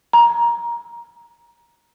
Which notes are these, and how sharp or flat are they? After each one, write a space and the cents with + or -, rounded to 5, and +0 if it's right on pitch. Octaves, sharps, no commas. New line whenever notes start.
A#5 +15